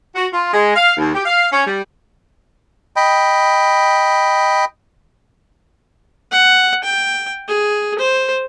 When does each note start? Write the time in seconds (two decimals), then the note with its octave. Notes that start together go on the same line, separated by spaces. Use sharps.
0.15 F#4
0.32 F4
0.52 G#3
0.75 F5
0.97 D#2
1.14 G4
1.25 F5
1.51 C#4
1.65 G3
2.96 D#5 G5 B5
6.31 F#5
6.84 G5
7.48 G#4
7.99 C5